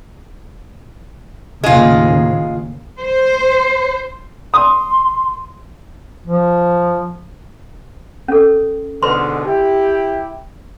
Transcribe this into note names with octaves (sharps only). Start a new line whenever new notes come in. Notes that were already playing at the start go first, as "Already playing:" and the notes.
D#2 A2 C#3 G#3 F4
C5
C6 D#6
F3
C#4 A4
G#2 B2 D3 B4 C6
E4 G4